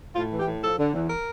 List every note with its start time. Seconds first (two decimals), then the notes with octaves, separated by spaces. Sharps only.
0.15 A2 F4
0.32 E3
0.39 G4
0.46 A2
0.62 F3 A4
0.79 D3
0.94 E2
1.10 A#4